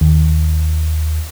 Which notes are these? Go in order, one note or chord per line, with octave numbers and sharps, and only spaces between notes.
D#2